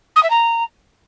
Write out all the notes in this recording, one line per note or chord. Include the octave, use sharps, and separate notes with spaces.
D#6
E5
A#5